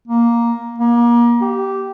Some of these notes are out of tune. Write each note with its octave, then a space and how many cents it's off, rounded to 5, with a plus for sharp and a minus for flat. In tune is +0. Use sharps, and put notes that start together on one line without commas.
A#3 +10
A#3 +30
G4 -15